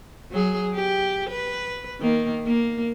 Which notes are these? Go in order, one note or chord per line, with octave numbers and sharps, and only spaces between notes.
F#3 G#4
G4
B4
D#3 A#3
A#3